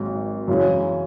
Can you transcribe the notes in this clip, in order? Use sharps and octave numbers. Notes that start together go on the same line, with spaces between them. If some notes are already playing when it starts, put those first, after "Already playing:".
Already playing: G#1 G#2 F#3
F#2 C#3 E3 G#3 C#4